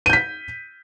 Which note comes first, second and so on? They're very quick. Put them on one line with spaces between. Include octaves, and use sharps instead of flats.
D#7 G6 B6